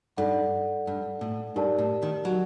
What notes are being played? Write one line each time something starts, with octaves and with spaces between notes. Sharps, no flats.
G2 D#4 A4 D5 F#5
G2
A2
G2 D#4 G4 A#4 D5 A5
A2
D#3
F#3